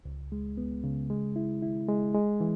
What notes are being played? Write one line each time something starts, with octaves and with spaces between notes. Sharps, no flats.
C#2
G#3
B3
C#3
G#3
E4
E4
G#3
G#3
E3